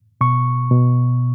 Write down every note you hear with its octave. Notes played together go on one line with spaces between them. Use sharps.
B2 C#6
B2